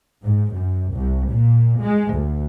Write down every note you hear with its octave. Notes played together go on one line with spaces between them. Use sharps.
G#2
F#2
C2
A#2
G#3
D2